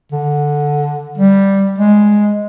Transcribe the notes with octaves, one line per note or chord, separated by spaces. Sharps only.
D3
G3
G#3